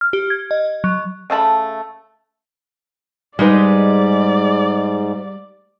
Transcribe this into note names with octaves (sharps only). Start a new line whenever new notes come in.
F6
G4
G#6
D#5
F#3
C#3 A3 A5 B5
G#2 G3 G#3 D#4 B4 D5